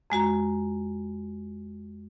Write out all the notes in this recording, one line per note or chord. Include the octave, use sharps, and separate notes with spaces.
F2 G#3 F#4 A#5